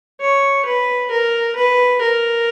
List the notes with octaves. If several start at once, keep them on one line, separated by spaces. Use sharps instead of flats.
C#5
B4
A#4
B4
A#4